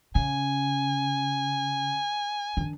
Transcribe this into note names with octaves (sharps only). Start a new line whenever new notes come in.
C#3 G#5
D#3 D4